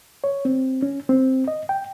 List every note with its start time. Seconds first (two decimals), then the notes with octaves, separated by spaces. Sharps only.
0.24 C#5
0.45 C4
0.82 C#4
1.09 C4
1.48 D#5
1.69 G5